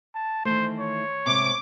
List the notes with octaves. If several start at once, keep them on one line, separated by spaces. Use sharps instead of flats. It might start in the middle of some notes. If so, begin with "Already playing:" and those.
A5
D#3 E3 A3 C5
C#5
G#2 C3 D6